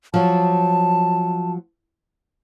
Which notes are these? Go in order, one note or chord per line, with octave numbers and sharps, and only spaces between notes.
F3 F#3 A5